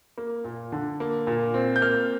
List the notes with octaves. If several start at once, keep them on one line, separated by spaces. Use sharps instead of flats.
A#3
A#2
D3
A#3
A#2
C4
G6
A#3 F6